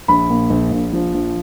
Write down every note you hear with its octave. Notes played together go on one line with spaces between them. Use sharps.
A#1 B5
A#2
A#1
A#1
F3
A#1